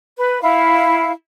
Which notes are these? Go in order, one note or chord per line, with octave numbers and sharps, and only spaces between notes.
B4
E4 F5